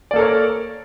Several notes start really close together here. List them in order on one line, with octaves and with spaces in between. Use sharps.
D5 A#3 A4 A#4 C#5